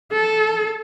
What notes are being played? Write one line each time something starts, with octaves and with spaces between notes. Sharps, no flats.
A4